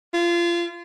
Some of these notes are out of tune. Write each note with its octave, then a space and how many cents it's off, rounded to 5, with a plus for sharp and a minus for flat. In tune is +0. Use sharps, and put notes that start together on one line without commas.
F4 -25